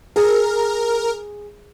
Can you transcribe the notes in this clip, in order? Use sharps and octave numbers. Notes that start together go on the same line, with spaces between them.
G#4 A#4